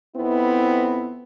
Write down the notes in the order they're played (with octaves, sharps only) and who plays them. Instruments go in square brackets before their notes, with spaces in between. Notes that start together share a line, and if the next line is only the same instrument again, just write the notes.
[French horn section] F2 B3 C4 E4